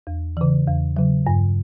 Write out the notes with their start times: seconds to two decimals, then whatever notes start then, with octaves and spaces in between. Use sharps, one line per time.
0.07 E2
0.37 C#3 E3
0.67 E2
0.97 C#3 F#3
1.27 G2